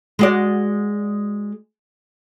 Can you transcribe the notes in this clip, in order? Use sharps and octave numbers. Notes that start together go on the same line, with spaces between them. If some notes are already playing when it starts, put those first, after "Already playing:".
G#3 F#4 D5